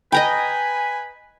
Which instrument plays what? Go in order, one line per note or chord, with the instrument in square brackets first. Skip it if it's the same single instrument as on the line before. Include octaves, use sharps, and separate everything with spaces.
[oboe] B4 [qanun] D#5 A#5 B5 [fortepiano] G5 [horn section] G#5